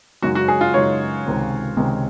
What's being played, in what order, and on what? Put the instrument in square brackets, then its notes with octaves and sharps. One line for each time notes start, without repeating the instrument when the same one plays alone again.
[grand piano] F#2 C#3 G#3 D#4 [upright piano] F#4
[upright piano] F#4
G#4
F4
[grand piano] F#2 C#3 G#3 D#4 [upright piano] C#5
[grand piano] C#2 C3 D#3 G#3 C4
C#2 C3 D#3 G#3 C4